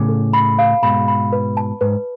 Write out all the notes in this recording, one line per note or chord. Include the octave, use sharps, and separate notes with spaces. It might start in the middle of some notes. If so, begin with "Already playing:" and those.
Already playing: A2 C#3 D6
A4
B5
F5
G#2 B2 B5
B5
B4
A5
G#2 B4